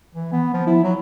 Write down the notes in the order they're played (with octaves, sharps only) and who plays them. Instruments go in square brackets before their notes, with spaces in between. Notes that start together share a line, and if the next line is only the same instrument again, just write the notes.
[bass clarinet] E3
B3
F3
E4
F#3